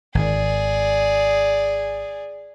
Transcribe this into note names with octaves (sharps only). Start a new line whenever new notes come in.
G#1 D#3 G#4 D5